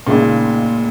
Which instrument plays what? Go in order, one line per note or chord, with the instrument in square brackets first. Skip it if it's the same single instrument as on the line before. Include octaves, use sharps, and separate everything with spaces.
[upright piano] C#2 C#3 G#3 D#4 [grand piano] A#2